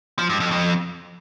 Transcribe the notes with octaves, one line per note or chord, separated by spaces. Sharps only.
F3
G2
F2
F2